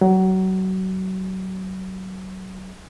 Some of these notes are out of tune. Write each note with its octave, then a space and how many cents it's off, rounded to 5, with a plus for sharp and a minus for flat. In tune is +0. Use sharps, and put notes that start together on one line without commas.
F#3 +25